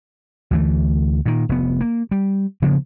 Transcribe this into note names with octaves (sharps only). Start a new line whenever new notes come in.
D2 E3 A3
A#2 D#3
F1 B3
A#3
G3
C#3 F3 A#3 B3